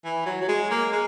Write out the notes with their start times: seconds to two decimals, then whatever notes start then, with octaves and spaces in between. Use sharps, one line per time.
0.05 E3
0.26 F#3
0.42 F#3
0.48 G#3
0.70 A#3
0.92 G#3